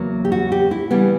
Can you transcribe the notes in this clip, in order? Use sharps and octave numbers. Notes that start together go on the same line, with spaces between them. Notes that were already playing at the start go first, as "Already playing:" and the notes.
Already playing: E2 C#3 F#3 A#3
G4
F#4
G4
E4
C#3 E3 G3 B3